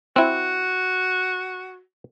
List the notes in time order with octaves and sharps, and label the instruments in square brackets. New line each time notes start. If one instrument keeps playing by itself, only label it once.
[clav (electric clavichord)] C4 E4 [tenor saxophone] F#4